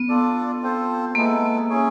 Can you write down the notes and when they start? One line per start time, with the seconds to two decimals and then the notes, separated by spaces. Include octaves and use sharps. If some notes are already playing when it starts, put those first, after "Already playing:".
Already playing: B3
0.09 D4 F4 A4 D5
0.63 C4 F4 A4 C5
1.15 G#3 A#3 B3 E4 A4
1.69 C#4 E4 G#4 C#5